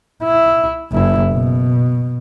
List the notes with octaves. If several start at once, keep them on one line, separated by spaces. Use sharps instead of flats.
E4
F#1 E4
B2